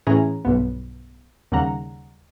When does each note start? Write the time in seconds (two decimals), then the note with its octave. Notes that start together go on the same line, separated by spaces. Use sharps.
0.07 A2 E3 C#4 G#4 A#5
0.45 B1 G2 B3
1.52 D#2 C#3 G3 F#5 A#5